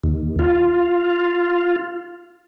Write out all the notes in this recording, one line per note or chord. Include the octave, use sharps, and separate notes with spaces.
D#2
F4